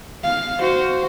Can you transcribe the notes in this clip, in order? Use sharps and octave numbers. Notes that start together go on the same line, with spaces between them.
F5
F#4 C5